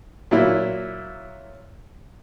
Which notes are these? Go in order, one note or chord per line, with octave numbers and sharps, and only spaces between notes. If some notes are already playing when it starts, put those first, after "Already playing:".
A#2 F#3 E4